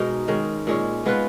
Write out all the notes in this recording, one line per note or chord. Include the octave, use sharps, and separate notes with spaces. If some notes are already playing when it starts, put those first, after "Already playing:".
Already playing: B2 G#3 D#4 A#4
D#3 G#3 C#4
A#2 G#3 C#4
G#3 B3 F4 B4